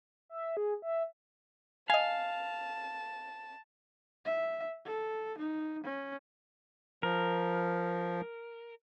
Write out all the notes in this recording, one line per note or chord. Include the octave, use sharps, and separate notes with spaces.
E5
G#4
E5
D#5 F5 G#5 A5
E5
A4
D#4
C#4
F3 A#4